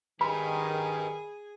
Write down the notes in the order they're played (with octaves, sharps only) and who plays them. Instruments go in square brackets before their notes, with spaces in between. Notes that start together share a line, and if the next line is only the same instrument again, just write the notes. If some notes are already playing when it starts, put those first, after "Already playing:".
[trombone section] D#3 [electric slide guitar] G4 B4 [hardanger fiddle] G#4 G#5 [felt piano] B5